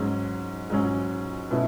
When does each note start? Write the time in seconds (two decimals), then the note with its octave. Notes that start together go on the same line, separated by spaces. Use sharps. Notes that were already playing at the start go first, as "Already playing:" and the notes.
Already playing: G#2 F#3 C#4
0.70 G#2 F#3 C#4
1.51 B2 A3 C#4 E4